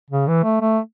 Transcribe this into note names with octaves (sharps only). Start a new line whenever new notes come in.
C#3
E3
A3
A3